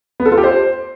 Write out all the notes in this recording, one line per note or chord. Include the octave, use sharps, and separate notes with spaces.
B3
A4
F4
G4
C5